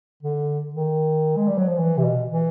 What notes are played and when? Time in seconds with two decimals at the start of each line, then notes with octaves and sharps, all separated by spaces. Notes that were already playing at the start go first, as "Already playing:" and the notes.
0.23 D3
0.74 D#3
1.37 G#3
1.47 G3
1.57 F#3
1.67 F3
1.78 E3
1.98 C3
2.04 B2
2.30 E3